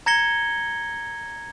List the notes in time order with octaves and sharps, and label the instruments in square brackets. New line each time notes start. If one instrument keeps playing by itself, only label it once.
[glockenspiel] A#5 G#6 A#6 C#7 G7